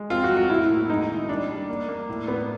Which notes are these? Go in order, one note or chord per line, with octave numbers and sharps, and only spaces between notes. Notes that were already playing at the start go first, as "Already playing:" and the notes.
Already playing: G#3
C4 F4
F#4
F#3
F#4
A2 E4
A#3
G#3 D#4
D#3
G3 D4
G3
A#3
A#3
A2
B3